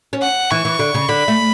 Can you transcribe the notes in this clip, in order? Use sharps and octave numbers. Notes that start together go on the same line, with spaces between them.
C#4
F#5
E3 C#6
E3
D3
C#3
D3 B5
A3